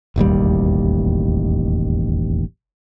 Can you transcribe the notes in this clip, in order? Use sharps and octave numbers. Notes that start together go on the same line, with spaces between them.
E1 A1 D#2 G3